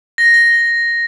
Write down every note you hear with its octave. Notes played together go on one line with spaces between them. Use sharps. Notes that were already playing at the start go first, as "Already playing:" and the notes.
A#6
A#6